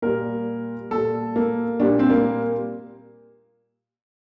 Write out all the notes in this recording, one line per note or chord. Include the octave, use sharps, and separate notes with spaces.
A#2 G3 A#4
A#2 G3 A4
A#3
A#2 G3 D4
C4
A#3